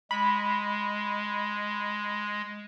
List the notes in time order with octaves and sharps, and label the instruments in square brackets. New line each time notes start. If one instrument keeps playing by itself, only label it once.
[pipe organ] G#3 [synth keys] B5